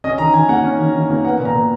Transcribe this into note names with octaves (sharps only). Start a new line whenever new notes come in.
C#4 D#5
D#3 A#5
D#3 G#5
A#3 F#5
C#4
D#3
D#3
A#3
B3 F#5
A#2
A#5
A#2